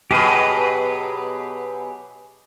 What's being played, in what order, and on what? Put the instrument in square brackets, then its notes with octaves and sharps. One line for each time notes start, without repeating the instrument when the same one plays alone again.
[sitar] B2 F#3 [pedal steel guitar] G4 G#4 B4